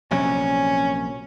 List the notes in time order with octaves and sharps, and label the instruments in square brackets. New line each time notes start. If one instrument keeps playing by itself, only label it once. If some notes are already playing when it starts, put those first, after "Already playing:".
[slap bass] A#1 C3 F#3 [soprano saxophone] C#4